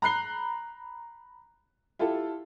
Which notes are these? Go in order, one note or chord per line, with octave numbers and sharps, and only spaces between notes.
A#5 B5 F#6 C7 G7
E4 F4 G4 A4